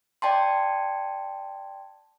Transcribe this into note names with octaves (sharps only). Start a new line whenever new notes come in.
D5 G5 A5 C6